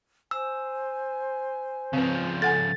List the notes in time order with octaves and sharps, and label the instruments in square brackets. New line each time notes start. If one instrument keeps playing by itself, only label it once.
[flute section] C5 G#5 [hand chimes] E6
[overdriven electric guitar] C#3 F3 [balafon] C4 B4
[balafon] A4 F#5 G#5 [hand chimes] A6